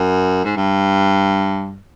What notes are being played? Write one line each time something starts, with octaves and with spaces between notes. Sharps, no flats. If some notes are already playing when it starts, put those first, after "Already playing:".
Already playing: F#2
G#2
G2